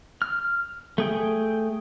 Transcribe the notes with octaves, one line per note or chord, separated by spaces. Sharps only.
F6
A3 G#4 G5